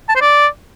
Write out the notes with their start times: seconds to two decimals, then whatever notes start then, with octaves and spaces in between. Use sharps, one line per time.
0.09 A5
0.15 C5
0.21 D5